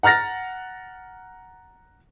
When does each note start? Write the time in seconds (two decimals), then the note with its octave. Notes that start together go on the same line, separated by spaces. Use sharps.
0.03 F#5 A#5 F6 A6 A#6